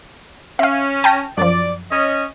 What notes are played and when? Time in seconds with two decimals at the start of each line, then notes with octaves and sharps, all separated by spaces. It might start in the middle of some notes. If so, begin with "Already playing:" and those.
0.59 C#4 E5 F5
1.04 G5 A5 A#6
1.38 F#2 F3 D5
1.91 C#4 D#5